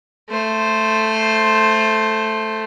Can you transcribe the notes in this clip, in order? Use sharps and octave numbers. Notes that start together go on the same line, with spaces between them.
A3 C5